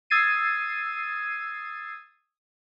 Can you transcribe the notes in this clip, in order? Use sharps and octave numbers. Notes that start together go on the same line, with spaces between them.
D#6 E6 G#6 A6 C7 D#7